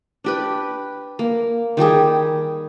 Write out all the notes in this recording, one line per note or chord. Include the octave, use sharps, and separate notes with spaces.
D4 G4 B4
A#3
D#3 G3 G4 G#4